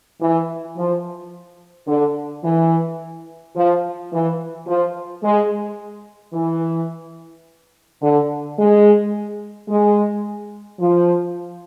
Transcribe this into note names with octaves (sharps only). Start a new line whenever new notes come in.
E3
F3
D3
E3
F3
E3
F3
G#3
E3
D3
G#3
G#3
F3